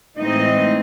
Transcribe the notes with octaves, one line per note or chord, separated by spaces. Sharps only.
A2 E3 G#3 C4 D#4 D#5